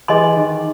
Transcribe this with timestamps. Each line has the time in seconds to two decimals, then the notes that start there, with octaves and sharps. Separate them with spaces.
0.08 E3 G#4 D#5 G#5 C6
0.36 D#3